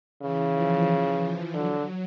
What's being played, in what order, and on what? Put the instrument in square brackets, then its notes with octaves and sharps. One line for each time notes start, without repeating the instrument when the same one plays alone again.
[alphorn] C#3 [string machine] E3
[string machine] F3
[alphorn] D3 [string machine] F#3